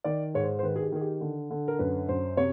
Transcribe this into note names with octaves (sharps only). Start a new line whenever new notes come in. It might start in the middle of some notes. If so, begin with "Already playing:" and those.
D#3 D5
G#2 C#5
C5
C5
D#3 B4
G#4
G4
D#3 G#4
G4
D3
D3
A#4
F#2 B4
F#2 C5
C3 C#5